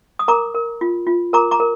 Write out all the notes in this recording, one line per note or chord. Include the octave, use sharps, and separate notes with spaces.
D#6
A#4 A#5 D6
A#4
F4
F4
A#4 A#5 D6
A#5 D6
A#4